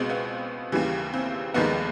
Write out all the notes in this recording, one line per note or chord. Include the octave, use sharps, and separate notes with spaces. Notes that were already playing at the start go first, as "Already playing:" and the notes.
Already playing: C#2 B2 G#3 C4
B3
D#2 C#3 E3 G3
C4
F1 D#2 D#3 G#3 B3